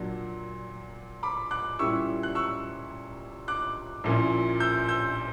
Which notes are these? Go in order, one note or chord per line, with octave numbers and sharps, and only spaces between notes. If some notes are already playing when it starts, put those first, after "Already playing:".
Already playing: A#2 F#3 A#3 D4
B5 D6
D6 F#6
A#2 G3 C#4 E4 C#6 E6
F#6
C#6 E6
D6 F#6
A#1 A#2 A#3 C#4 E4
E6 G6
E6 G6